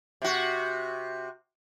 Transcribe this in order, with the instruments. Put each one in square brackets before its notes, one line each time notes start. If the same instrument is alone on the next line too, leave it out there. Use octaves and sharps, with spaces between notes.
[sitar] C3 F#4